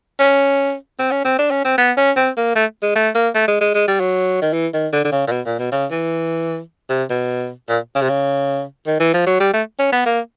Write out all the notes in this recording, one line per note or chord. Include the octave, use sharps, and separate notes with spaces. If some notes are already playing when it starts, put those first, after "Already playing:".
C#4
C4
C#4
C4
D4
C#4
C4
B3
C#4
C4
A#3
A3
G#3
A3
A#3
A3
G#3
G#3
G#3
G3
F#3
D#3
E3
D#3
D3
D3
C#3
A#2
B2
A#2
B2
C#3
E3
C3
B2
A#2
C#3
C3
C#3
D#3
E3
F3
F#3
G3
A3
C#4
B3
A#3